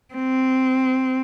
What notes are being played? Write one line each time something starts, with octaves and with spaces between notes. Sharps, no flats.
C4